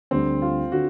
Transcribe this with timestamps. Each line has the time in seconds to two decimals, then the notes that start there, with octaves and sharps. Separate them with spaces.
0.11 D2 D3 G3 C4
0.42 F4
0.72 D3 F#4